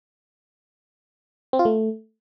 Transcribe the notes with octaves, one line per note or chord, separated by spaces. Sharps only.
C4
F4
A3